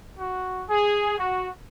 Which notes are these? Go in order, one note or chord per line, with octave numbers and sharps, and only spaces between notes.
F#4
G#4
F#4